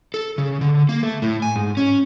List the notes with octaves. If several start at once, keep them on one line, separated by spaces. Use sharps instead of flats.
A4
C#3
D3
A#3
A3
A2
G#5
G#2
C#4